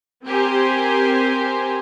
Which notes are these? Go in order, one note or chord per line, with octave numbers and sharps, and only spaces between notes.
C4 G4 A#4 C5 G#5